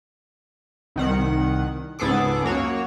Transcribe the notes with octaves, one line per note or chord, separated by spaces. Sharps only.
C2 D#3 F#5
C#2 G#2 B3 G#4 A4 D6
F#2 A#3 F#4 C#5